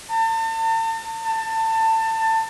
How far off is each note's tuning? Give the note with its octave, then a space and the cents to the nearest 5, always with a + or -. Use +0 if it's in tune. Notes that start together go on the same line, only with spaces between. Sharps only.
A5 +40
A5 +25